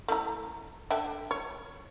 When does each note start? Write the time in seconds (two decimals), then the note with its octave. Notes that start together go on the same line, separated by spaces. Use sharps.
0.08 A3 E4 A#5
0.91 D3 E5 G5
1.31 C#5